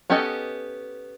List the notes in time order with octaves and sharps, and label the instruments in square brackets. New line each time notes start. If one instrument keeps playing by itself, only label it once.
[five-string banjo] B3 C#4 G4 A4 D#5